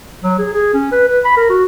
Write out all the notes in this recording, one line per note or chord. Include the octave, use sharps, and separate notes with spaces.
F#3
G#4
G#4
C#4
B4
B4
B5
A#4
F#4